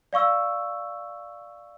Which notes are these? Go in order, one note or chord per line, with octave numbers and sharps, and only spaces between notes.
D5 F5 C#6 E6